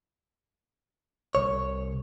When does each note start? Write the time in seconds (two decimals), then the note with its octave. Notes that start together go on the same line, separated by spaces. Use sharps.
1.35 C2 C#5